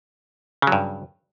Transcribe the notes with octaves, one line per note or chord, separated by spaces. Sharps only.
G2 C#3 F#3